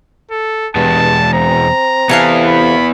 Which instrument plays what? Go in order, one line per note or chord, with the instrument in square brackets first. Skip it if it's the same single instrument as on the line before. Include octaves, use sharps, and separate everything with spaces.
[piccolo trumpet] A4
[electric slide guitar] E2 B2 G#3 [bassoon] G2 [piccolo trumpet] A5
[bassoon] C4 [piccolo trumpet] A#5
[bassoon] C3 [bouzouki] E3 A4 F5 [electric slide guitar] B3 E4
[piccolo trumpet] B5